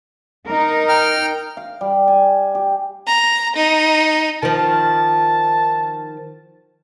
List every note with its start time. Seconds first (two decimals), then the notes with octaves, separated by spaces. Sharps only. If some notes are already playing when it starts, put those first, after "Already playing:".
0.47 D#4 A#4
0.89 G5 F6
1.57 F5
1.81 G3
2.08 G#5
2.55 G4
3.07 A#5
3.56 D#4
4.43 D#3 F3 A5